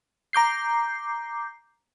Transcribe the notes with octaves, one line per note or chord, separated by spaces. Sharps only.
A#5 D6 G6 C7